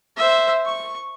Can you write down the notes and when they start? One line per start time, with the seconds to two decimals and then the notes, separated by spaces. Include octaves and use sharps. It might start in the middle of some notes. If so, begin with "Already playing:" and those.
0.16 C5 E5
0.65 C#6